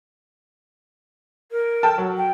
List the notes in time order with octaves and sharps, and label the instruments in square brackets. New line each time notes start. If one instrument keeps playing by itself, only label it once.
[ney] A#4
[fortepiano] A4 G5 A5
F#3
[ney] G5